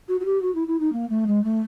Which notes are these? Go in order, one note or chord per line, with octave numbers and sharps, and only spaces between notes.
F#4
F#4
G4
F#4
E4
E4
D#4
A#3
A3
G#3
A3